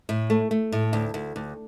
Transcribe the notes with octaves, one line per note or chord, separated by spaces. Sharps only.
A2
A3
A3
A2
D2
D2
D2